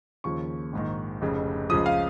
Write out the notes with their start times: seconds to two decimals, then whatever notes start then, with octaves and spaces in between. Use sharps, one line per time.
0.24 D#2 C#3 F3 C#6
0.73 A#1 G#2 D#3
1.22 F1 F2 C#3
1.70 C#2 C#3 F3 D#6
1.86 F5